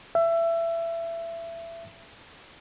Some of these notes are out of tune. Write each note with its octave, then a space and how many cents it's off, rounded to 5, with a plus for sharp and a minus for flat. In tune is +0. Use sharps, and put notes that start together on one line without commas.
E5 +25